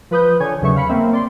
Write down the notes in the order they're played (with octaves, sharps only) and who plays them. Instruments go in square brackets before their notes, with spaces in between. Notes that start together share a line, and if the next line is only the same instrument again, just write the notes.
[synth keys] F3 B4 D#6 G6
D3 C#5 G#5 G#6
D#2 C#3 F#3 E5 C#6
F5 B5 C#7
A#3 C4 E5
D5 C6